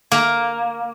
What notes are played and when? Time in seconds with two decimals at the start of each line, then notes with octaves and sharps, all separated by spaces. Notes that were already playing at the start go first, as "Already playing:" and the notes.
0.12 A#3